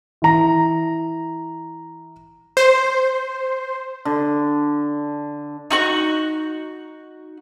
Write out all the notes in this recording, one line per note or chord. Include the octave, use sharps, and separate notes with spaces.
E3 A#5
C5
D3
D#4 F#4 C#6